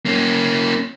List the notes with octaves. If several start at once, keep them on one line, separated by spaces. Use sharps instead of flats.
A#3 C#4